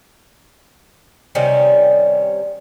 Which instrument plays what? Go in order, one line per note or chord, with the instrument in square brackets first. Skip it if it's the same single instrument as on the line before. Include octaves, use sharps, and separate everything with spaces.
[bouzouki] C3 D#3 G3 C#4